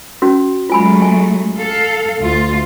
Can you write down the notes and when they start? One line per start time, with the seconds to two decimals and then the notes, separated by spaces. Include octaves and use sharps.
0.22 C#4 F#4
0.70 F#3 G#3 A3 F4 G#5 B5
1.02 G#5
1.59 A4 F5
2.20 D2 F4